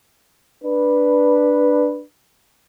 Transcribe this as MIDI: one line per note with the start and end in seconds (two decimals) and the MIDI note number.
0.64 2.03 62
0.64 2.03 71